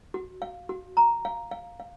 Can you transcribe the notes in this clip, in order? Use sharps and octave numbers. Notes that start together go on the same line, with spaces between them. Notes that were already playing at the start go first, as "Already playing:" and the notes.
F#4
F5
F#4
A#5
F5
F5
F5